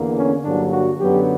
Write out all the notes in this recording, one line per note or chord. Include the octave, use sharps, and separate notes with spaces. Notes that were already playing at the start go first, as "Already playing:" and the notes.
Already playing: E2 D3 A#3
C#4
G2 D3 F#3 A#3 D4
F#4
F#2 D3 F#3 B3 G4